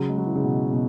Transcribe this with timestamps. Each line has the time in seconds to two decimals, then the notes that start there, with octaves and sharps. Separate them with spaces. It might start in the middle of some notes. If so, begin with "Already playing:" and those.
Already playing: C#3 F#3
0.09 G#3
0.18 F#3
0.26 E3
0.35 C#3
0.44 B2
0.73 B2